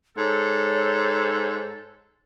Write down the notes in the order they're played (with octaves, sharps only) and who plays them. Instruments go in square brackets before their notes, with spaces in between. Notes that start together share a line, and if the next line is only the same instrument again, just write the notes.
[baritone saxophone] G#2 [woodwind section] A4 [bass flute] C#5